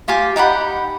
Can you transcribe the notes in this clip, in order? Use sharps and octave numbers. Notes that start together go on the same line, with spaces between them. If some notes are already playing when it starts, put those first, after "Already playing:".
F4 G4 G#5 D6
D#4 G4 F#5 B5